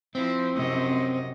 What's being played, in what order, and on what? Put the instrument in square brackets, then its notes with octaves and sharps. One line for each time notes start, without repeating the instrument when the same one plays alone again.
[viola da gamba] F3 E4 [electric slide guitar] C4
[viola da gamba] F#2 C3 D#5